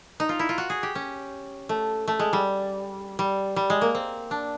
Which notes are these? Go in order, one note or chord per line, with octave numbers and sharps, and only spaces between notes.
D#4
F4
E4
F4
F#4
G#4
G4
C#4
A3
A3
G#3
G3
G3
G3
G#3
A#3
C4
D4